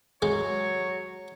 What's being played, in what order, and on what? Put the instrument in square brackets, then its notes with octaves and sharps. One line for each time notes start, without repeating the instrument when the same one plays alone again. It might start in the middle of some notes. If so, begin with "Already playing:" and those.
[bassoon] F#3 [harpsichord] G#3 [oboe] C#5